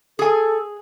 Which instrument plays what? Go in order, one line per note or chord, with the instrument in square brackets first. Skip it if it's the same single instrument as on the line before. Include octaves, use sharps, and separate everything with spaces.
[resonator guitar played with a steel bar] G#4 G#5 [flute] A4